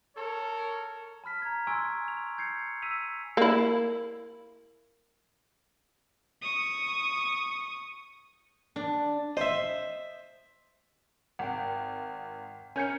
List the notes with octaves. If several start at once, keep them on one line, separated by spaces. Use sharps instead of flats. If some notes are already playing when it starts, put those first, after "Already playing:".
A4 A#4 C#5
A5 B5 F6 B6
A#5 G#6
G#5 C6 C#6 E6 G#6 D7
F7
G6 G#6 C7 C#7
E6 B6 D#7 F7
A#3 E4
C#6 D#6
D4
C5 D#5 E5
G#1 F#5 G5
C#4 A#4 C#5 G#5 G6 C#7